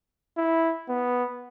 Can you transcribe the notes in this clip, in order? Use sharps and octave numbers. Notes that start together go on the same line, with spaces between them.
E4
B3